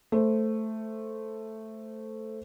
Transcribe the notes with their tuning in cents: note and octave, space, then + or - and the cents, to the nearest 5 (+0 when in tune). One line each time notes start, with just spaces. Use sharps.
A3 +0 C5 +0